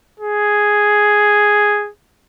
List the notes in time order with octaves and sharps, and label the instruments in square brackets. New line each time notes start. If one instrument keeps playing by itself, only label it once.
[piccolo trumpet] G#4